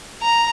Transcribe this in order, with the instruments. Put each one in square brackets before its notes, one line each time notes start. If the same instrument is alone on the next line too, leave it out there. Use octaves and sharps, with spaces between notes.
[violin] A#5